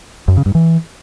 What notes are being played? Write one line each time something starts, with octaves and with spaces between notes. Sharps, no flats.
F#2
C#3
G2
E3